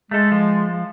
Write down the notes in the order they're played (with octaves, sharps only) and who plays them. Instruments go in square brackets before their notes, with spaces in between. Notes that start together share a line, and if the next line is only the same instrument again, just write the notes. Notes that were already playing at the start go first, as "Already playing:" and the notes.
[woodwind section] G#3 [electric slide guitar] A3 A4
[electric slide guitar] F3